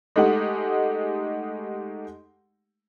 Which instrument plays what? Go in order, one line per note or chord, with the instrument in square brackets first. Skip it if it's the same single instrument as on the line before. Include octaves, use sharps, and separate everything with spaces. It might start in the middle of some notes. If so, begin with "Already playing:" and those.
[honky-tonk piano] G#3 A3 D#4 G4 F#5